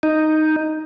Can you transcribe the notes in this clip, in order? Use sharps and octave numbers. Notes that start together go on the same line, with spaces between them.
D#4